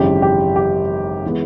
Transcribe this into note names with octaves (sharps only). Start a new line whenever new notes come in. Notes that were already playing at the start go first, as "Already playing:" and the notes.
Already playing: G#1 F#2 C#3 E3 G4
G4
G4
E3 G#3 B3